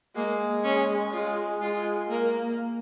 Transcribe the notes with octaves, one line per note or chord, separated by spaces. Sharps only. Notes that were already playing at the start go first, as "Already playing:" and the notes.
G#3 A#3
C#4
G#3 F4
G#3 F4
A#3 A#4